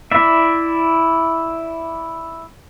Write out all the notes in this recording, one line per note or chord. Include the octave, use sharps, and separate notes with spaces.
E4 D5 E5